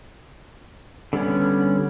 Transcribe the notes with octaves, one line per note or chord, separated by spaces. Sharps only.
D3 G3 B3 C#4